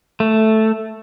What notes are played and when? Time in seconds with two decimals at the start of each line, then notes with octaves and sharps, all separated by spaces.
0.20 A3